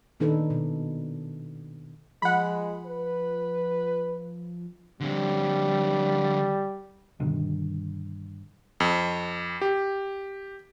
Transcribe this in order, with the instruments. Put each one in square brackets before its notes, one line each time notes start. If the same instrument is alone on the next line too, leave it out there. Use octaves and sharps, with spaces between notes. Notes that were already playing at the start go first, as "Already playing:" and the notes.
[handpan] A#2 D#3 D4 D#4 A4 B4
B2
[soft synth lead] F3 [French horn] G#3 [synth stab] F#5 B5
[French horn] B4
[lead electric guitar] D3 C4 [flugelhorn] G3
[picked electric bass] G2 B2 D3 D#3
[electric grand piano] F2
G4